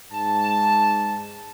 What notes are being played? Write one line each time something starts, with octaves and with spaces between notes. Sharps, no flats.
G#2 A5